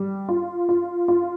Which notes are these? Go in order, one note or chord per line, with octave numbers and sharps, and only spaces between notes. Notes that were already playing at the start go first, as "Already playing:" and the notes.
Already playing: G3
F4
F4
F4